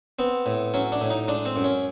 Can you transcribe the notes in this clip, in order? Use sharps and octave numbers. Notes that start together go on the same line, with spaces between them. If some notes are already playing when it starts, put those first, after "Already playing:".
B3 C4
A2
F#3 C#4
D4
A2
D#4
G#3 D4
C4
F#2
C#4